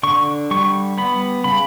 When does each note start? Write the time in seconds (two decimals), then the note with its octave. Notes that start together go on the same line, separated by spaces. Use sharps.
0.03 D3 C#6
0.51 G3 C#6
0.98 B3 B5
1.44 C#3 B5